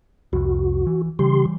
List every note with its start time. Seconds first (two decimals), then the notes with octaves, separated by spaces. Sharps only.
0.33 C2 F2 F#4
0.87 E3
1.19 C#3 E3 G3 G4 C6